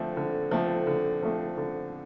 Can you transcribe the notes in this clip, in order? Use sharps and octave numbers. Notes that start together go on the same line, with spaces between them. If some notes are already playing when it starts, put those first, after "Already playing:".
Already playing: D3 F3 A3 C4
D3
F3 A3 C4
D3
F3 A3 C4
D3